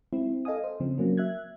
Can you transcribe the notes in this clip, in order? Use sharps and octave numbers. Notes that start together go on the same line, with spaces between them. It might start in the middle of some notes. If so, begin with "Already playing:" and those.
G#3 C4 E4
A4 D#5 F5 G#5 D#6
C5
C#3 F3 C4
F#3 A#3 C#4
E5 F#6 G#6